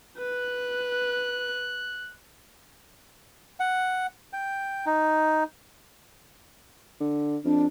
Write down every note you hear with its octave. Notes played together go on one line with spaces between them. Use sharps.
B4 F#6
F#5
G5
D#4
D3
F2 D4